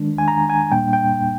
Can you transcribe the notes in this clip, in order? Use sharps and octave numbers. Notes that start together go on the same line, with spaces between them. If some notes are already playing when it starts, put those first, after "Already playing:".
Already playing: D#3 G#3 D4
G#5
A#5
G#5
A#2 G3 A#3 D4 G5
G5